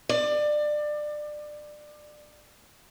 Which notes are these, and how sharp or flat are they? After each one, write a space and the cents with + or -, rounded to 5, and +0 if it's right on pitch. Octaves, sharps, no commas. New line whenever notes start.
D5 +25